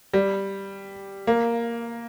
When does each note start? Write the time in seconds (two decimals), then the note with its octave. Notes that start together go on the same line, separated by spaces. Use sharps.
0.14 G3
1.27 A#3